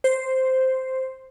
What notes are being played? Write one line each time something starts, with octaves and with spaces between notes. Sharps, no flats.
C5